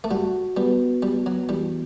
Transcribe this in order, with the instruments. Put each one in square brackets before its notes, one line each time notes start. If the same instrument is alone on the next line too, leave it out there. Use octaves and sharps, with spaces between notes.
[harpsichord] A3
[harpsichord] G3 [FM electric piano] F#4
[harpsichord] G3 [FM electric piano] B3
[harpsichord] G3 [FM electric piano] B3
[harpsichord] F#3
[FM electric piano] E3 [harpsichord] G3